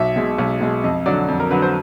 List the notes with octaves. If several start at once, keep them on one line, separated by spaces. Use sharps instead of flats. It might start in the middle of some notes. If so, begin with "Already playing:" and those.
Already playing: B1 E5
B2 G#3
B1
B2 G#3
F2 D#5
D3 F#3 D5
F2
A#4
D3 F#3 B4
C5